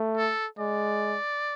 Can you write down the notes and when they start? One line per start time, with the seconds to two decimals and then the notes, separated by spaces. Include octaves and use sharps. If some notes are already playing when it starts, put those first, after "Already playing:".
Already playing: A3
0.17 A4
0.58 G#3 D5